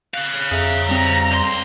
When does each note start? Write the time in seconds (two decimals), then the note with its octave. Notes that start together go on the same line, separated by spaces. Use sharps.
0.14 C#5 F5 F#6
0.51 F2 G#4 E5 A#5
0.89 G3 C4 A#5
1.31 C#2 C6